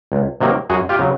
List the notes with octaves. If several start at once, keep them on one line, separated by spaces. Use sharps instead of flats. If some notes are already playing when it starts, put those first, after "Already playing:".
C#2
C3 D#3 F#3 A#3
F#2 F#4 G#4
F4 G4
C#3 F#3